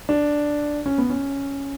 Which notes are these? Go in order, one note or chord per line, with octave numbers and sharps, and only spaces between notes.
D4
C#4
B3
C#4